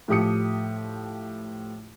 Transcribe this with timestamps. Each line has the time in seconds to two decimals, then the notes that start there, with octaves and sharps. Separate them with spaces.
0.08 A2 F3 G4 D#6 C#7